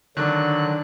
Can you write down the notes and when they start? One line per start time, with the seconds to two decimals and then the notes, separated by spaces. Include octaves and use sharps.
0.17 D3 D#3 F#3 D4 F#6